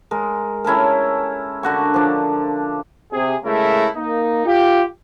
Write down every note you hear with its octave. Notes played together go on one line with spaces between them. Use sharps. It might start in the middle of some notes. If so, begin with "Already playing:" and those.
G#3 A#4
C#4 E4 A4 A#4
D3 F#4 C#6
F3 D4
C3 G#4
C#3 G#3 A3 E4 A#4
A#3 D#4
F4 G4